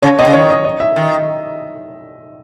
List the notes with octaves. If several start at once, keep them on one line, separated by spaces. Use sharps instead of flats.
C#3 C#5
B2 D#5
C#3
D#3 C#5
D#5
D#5
E5
D#3